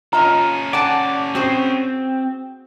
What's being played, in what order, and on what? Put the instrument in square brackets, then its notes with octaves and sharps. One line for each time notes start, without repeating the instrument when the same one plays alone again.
[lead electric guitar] C#4 A4 [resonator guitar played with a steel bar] F4 D#5 [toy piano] A#5
[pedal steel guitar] D5 [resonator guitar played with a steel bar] F#5 G#5 A5
[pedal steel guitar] C4 [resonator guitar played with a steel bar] F#4 G#4 C5